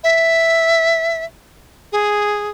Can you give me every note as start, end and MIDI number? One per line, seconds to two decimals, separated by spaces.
0.04 1.24 76
1.92 2.50 68